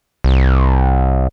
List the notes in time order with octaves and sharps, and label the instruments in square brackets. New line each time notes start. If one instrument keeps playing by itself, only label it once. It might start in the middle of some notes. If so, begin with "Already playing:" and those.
[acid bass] C2